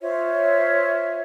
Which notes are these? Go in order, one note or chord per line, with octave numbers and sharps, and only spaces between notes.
F4 C5 C#5 E5